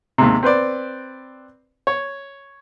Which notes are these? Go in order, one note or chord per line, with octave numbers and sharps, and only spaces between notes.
D#2 G#2 C3
C4 B4 C5 D5
C#5